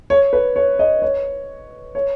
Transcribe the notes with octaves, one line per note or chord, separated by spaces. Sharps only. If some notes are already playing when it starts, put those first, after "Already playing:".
C#5
B4
C#5
D#5
C#5
C#5